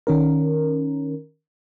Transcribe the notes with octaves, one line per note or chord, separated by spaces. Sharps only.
D#3 C#4 A#4